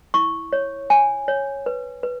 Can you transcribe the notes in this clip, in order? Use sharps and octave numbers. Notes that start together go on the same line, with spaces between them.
E4 C#6
C#5
C#5 G#5
C#5
B4
B4